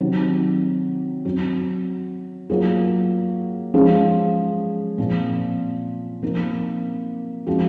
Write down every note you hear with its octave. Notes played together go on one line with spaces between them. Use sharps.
C3 D#3 F#3
F#3 C4 F#4
F#3 A#3 F4 G#4
F3 G#3 C#4 G#4
A#2 F3 C4
C3 F3 A#3 D#4 A#4
F3 G#3 C4 F#4